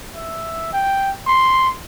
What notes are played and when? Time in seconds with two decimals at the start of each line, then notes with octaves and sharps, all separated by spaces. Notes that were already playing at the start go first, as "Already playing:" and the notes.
0.15 E5
0.73 G5
1.27 C6